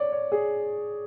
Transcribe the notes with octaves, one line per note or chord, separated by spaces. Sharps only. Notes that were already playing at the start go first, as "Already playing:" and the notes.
Already playing: C#5 D5
C#5
G#4